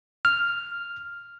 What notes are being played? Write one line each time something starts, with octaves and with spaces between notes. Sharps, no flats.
F6